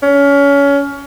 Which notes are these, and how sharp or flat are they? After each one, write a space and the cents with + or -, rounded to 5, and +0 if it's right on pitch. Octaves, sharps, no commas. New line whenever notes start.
C#4 +25